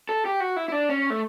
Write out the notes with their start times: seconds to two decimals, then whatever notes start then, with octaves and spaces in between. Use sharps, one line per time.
0.09 A4
0.25 G4
0.40 F#4
0.56 E4
0.68 E4
0.72 D4
0.89 C#4
1.10 A3